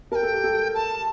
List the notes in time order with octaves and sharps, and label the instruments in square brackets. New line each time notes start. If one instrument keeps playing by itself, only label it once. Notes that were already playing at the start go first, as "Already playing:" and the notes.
[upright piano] A#4 [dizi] G5 A5
[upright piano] A4
G4
A4
[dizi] A5